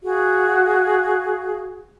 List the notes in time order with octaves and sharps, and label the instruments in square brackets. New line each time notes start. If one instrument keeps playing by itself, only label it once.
[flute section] F#4 G#4 F5